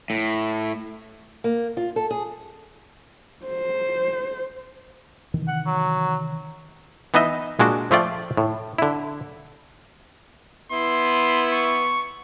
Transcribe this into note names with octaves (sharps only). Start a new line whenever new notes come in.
A2
A#3
F4
A4
G#4
C5
C3 D#3 E3
F#5
F#3
E3 B3 D#4 B4 D#5 E5
A#2 G#3 D4 F#4
F3 A3 F4 D5 G5
A2
D3 E4
B3 E4 C6
C#6